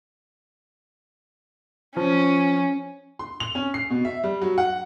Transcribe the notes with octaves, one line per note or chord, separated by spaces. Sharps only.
F3 C#4
C6
F7
C#4
C7
B2
E5
G3
F#3
F#5